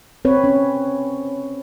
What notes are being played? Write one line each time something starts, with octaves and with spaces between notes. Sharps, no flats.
C4 B4 C#5
C#4